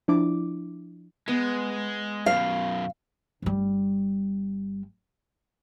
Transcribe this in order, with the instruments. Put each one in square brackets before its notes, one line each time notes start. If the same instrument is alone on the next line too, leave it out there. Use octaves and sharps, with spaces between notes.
[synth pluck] F3 D4 E4 D6
[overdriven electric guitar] G#3 [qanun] B3
[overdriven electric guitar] F#2 B2 [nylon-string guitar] F5
[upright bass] G1 G3